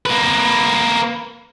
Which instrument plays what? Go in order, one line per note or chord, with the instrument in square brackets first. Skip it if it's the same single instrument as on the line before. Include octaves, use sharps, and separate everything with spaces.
[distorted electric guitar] A#3 B4